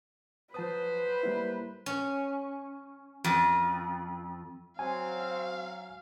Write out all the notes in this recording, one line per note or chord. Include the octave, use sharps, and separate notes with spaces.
F3 F#3 B4 C5 A5 D#6
G3 A#3 E4
C#4
F2
F#3 C4 F5 G#5